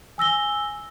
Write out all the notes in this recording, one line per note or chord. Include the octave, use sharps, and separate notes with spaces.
G#5 E6 A#6 G7